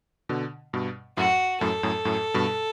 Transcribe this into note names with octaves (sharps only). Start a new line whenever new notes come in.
B2 D3
G2 B2
F#2 A2 F#4
F#2 A2 A4
F#2 A2
F#2 A2
G2 B2